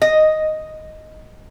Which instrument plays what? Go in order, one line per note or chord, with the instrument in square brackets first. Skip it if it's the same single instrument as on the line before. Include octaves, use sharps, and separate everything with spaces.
[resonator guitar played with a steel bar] D#5